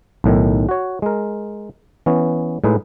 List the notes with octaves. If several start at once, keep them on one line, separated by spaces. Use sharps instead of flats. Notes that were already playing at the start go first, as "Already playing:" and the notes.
B1 A2 D#3
F#4 C#5
G#3 A#4
E3 B3 C#4
A2 G#3 D#4 B4